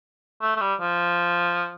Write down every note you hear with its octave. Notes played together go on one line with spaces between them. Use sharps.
A3
A3
G3
F3